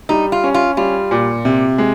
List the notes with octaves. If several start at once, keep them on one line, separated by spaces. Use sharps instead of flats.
G3 D#4
F4
C#4
F4
G3 F4
A#2
C3
G#3